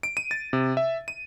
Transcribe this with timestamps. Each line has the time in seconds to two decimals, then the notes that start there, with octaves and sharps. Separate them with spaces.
0.03 D7
0.17 D#7
0.31 A6
0.53 C3
0.77 E5
1.08 D#7